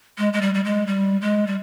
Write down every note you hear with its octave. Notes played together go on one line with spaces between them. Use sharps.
G#3
G#3
G3
G3
G#3
G3
G#3
G3